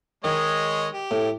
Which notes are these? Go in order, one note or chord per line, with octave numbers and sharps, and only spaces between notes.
D#3 G#3 C#5 D#5
G4
A2